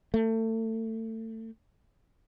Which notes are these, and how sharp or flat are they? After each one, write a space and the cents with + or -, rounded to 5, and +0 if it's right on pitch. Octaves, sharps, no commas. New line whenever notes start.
A3 +30